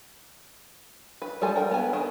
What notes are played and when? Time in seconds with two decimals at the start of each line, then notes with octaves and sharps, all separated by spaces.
1.22 B4
1.41 G3 G#3 A4 G#5
1.56 A#4 G5
1.71 B3 G#5
1.93 D#3